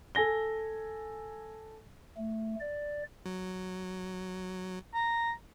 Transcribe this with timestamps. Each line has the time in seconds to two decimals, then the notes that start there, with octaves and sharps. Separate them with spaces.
0.15 A4 G#5 A#6 G7
2.17 A3
2.60 D5
3.26 F#3
4.94 A#5